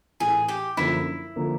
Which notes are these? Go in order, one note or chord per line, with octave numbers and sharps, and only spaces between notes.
A2 E3 A3 G#4
G4
F#2 D3 F3 A#3 E4
D3 F3 A#3